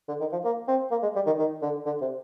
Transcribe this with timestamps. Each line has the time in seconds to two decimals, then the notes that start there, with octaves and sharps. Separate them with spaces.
0.08 D3
0.20 D#3
0.32 F3
0.44 A#3
0.68 C4
0.91 A#3
1.03 G#3
1.15 G3
1.26 D#3
1.38 D#3
1.62 D3
1.86 D3
2.01 C3